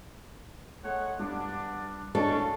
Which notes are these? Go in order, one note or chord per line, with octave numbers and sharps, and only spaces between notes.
G#3 A3 C#5 F#5
G2 B3 D4
A2 C#4 D4 A4 D#5 F5 A5 C#6